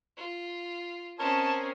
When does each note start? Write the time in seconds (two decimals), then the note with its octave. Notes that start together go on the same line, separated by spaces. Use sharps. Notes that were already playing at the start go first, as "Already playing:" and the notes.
0.17 F4
1.19 C4 C#4 A#4 C5 C#5 D#5 A5